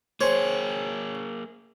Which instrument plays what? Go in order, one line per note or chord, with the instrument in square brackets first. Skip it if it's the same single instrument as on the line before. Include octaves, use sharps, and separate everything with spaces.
[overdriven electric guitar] A#3 G#4 [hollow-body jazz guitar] C5 [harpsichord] C#5